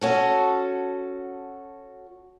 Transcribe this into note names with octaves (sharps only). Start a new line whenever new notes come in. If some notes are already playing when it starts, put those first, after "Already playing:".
C#4 F#4 A4